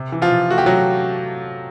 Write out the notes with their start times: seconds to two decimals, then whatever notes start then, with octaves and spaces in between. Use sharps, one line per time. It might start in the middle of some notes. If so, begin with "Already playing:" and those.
Already playing: C3
0.12 E3
0.22 F3 F4
0.31 C3
0.50 A3 F#4
0.58 G4
0.66 C3 F#3 F#4